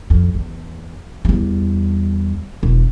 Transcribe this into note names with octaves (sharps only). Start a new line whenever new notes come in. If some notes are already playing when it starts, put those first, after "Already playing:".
F2
E2
E2 G3
E1